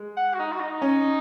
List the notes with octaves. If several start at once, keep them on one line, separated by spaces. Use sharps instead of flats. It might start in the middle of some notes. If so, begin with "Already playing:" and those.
Already playing: G#3
F#5
F#4
D#4
F#4
D#4
C#4